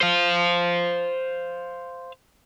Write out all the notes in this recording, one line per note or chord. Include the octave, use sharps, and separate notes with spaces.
C5 F5